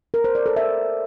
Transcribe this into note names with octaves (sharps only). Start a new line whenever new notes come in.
A#4
C5
D5
A4
E5